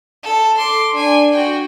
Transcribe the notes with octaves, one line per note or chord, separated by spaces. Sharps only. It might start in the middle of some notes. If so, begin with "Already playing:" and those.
A4
C6 D6
D4 G#5
F#4 G5